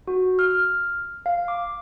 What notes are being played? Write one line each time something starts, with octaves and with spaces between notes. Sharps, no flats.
F#4
F6
F5
D6